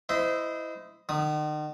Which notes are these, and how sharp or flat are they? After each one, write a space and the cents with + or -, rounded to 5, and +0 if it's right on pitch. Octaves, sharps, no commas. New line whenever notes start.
E4 +0 C5 -25 D#5 +0
D#3 -40 D#6 +0